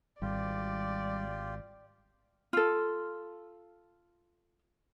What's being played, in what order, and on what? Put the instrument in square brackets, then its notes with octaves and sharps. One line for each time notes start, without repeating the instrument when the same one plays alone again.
[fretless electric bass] G#1 [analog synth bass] G3 [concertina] F4 G4 [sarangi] D5
[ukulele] F4 A4